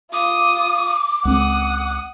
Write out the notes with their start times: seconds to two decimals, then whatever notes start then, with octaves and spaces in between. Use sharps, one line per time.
0.13 F4 D6 D#6
1.25 C#2 C4 F#5 D#6